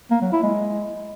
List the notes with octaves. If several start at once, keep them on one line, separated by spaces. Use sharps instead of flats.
A#3
F#3
E4
G#3